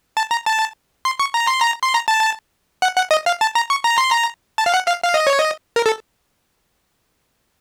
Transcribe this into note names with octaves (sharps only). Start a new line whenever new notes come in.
A5
A#5
A5
C6
C#6
A#5
C6
A#5
C6
A#5
A5
F#5
F#5
D#5
F5
A5
A#5
C#6
A#5
C6
A#5
A5
F5
F#5
F5
F5
D#5
C#5
D#5
A#4
A4